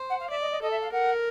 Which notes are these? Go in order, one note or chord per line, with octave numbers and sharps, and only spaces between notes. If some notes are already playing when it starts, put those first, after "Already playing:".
Already playing: C5
F#5
F5
D5 E5
D#5
D#5
A4 D#5
E5
F5
A#4 F#5